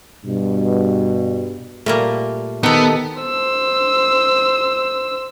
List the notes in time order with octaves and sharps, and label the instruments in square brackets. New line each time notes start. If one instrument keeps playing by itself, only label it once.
[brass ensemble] G2 B2
[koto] A#2 G3 A#3 [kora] A3
[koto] D#3 G4 [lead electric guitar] B3 [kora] D#4 [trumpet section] A4
[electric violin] C5 E6